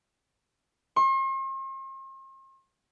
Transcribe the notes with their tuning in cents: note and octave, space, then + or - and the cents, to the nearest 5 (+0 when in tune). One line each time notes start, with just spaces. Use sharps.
C6 +45